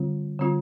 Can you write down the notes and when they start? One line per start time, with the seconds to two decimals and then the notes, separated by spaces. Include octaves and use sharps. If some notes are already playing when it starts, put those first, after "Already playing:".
Already playing: D3 G3 C4 F4
0.39 D3 G3 C4 F4